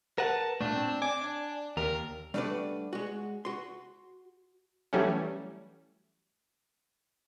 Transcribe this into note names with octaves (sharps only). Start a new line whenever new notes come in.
A#4 B4 F#5 A5
A#2 A3 D4
C4
D5 G#5 D6
D4
D#2 A#4
G3 A3 D4 F#4 B4 D5
G#3 F#4
F#4 C6
E3 F#3 G3 A3 C#4